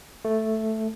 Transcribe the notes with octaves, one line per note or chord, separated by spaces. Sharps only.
A3